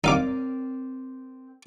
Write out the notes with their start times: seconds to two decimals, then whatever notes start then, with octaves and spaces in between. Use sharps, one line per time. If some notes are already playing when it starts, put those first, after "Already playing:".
0.04 C4 D#4 A#4 D5 F5 D6